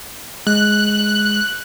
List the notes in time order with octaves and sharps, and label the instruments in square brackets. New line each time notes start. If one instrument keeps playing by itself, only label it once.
[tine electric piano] G#3 [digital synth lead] F#6